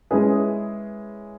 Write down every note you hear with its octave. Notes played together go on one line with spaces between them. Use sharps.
G#3 C#4 E4 G#4 B4